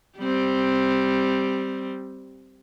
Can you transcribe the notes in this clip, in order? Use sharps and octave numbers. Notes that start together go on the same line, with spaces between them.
G3 C4